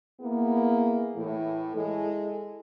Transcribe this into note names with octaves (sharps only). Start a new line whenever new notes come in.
A#3 B3 E4 G#4
A2 E3 A3
G#3 E4 A4